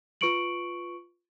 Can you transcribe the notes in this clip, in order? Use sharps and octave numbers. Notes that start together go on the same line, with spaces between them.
F4 B4 C#6 C#7 D7 F#7